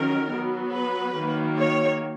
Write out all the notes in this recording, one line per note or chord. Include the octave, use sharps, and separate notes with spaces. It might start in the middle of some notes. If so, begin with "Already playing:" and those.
Already playing: D#3 F#3 C#4 A#4
F#3 B3
B4
D#3 F#3 A#3
C#5